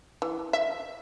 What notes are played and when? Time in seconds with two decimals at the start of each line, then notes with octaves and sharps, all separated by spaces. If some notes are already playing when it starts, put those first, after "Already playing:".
0.22 E3
0.53 E5